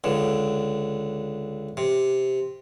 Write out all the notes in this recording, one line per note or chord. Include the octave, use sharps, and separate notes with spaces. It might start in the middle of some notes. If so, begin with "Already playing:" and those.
C#2 D3
C3